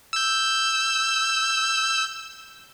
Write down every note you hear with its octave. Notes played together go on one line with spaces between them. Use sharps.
E6 G6